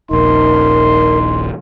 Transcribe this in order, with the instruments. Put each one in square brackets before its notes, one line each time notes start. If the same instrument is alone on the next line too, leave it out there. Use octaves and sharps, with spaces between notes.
[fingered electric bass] D#1 A#1 [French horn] D#4 [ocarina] A#4 [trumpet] C6